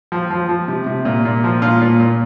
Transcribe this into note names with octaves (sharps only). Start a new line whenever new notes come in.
F3
F3
F3
C3
C3
A#2
A#2
F3
A#2 F4
A#2
A#2